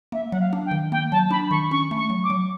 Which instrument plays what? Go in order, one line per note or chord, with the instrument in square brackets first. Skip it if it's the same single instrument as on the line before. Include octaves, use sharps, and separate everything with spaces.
[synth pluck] A#3 [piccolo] E5
[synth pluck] F#3 [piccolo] F#5
[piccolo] F5
[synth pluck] D4
[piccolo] G5
[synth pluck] D#3
[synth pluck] A#3 [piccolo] G5
[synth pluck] F#3 [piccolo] A5
[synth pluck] D4 [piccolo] B5
[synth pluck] D#3 [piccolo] C#6
[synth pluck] C#4 [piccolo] C#6
[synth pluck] A3
[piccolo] C#6
[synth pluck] F#3
[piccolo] D6
[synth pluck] F#3